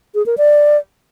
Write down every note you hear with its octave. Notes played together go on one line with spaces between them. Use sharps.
G#4
A#4
D5